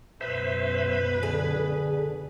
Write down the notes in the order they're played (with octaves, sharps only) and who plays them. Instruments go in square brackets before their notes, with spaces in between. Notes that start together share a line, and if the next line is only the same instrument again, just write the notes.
[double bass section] C#2 F#2 B2 [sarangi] B4 [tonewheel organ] C5 E5
[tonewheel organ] D3 [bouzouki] G#4